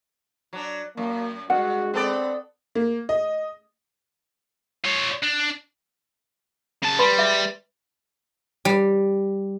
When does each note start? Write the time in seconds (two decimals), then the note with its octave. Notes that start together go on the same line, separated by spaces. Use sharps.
0.53 F#3 D4
0.97 F#2 A#3
1.50 G2 G#3 F#4 F#5
1.94 B3 C4 A4 D5
2.75 A#3
3.09 D#5
4.85 F4 C#5
5.23 D4
6.82 C#3 A5
6.99 G3 B4 B5 C6
7.18 G#4 E5
8.65 G3